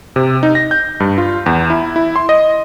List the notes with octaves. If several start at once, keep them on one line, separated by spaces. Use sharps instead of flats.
C3
D#4
A#6
G6
G2
F4
E2
E4
E4
C6
D#5